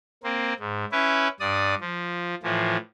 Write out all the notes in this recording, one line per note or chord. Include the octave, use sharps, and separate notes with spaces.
A#3 C4
G#2
C#4 E4 B4
G2 D5 D#6
F3
A2 E3 F3